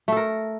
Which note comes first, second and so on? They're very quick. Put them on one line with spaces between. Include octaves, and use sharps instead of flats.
A3 A4 A#4